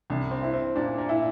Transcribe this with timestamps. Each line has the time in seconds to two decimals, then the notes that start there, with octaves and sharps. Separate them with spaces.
0.10 C2 D4
0.31 C4
0.43 E4
0.54 C4
0.76 A#2 D4
0.98 A#2
1.09 E4